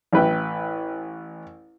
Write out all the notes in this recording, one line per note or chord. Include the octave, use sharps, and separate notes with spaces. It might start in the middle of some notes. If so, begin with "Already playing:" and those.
A1 E4 B4 G5